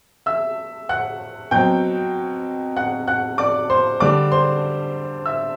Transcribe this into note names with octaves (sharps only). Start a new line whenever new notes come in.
E5 E6
F#5 F#6
B2 F#3 C4 G5 G6
F#5 F#6
F#5 F#6
D5 D6
C5 C6
D3 G3 D4 D5 D6
C5 C6
E5 E6